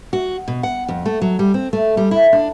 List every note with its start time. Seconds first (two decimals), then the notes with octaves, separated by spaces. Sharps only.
0.13 F#4
0.48 B2
0.63 F#5
0.88 F2
1.05 A3
1.22 F#3
1.39 G3
1.54 C4
1.73 A3
1.97 G3
2.11 E4
2.33 D4